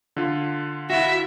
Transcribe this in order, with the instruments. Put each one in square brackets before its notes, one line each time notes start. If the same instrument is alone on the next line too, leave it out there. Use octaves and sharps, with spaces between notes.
[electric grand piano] D3 F4
[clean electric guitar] E4 F#4 [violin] E5